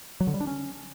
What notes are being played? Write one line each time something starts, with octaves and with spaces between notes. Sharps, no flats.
F#3
D3
G3
D4
C#4